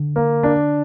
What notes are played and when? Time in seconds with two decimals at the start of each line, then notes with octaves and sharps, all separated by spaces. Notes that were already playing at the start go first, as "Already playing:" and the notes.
Already playing: D3
0.16 A#3
0.43 D4